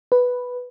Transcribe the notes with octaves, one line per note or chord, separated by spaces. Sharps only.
B4